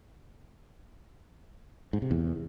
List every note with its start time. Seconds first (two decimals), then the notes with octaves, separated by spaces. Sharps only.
1.93 G#2
2.02 C3
2.11 E2